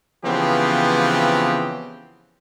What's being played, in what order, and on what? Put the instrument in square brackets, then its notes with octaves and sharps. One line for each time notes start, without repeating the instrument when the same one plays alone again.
[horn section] C#3 E3 F3 B3 C4 G4